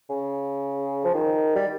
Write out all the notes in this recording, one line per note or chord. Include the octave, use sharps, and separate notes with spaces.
C#3
F3
D#3
G3